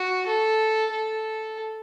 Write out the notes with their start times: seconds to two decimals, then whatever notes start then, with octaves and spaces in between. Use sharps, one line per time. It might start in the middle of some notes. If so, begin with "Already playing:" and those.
Already playing: F#4
0.27 A4
0.92 A4